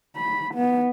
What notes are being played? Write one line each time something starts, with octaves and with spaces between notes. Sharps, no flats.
B5
B3